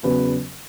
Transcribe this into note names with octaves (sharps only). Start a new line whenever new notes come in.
E2 C#3 F#3 B4